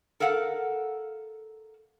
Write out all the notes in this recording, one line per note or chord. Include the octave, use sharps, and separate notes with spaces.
A4 A#4 F5 F#5